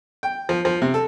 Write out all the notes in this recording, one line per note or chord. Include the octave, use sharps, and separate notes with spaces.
G5
F3
F3
C3
A4